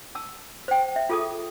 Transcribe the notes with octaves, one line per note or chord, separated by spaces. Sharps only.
A5 E6
C5 G5
E5
F4 G#4 A4 A5 D#6